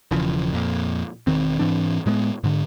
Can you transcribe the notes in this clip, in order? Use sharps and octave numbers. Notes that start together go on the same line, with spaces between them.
E1 C#3 E3 F3
F2 A#2
E1 D#3 C4
G#2 E3 C4 D4
A2 G#3 A3 B3
G#2 D3